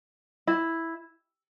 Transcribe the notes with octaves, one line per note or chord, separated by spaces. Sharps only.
E4